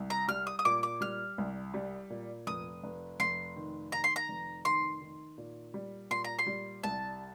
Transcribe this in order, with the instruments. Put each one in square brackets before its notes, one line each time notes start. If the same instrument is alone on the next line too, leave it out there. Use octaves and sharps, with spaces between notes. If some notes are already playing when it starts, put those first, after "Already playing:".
Already playing: [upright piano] C2
[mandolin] A#5
[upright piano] G3 [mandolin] F6
[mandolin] D#6
D#6
[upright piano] A#2 [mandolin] D6
[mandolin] D6
[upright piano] G3 [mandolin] F6
[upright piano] C2
G3
A#2
[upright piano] F1 [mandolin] D#6
[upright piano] F1
[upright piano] F1 [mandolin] C6
[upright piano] D#3
[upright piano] D#3 [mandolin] A#5
[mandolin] C6
A#5
[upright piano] F1
[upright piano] D#3 [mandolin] C6
[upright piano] D#3
A#2
G3
[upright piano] A#2 [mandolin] C6
[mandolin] A#5
C6
[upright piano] G3
[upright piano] C2 [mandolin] A5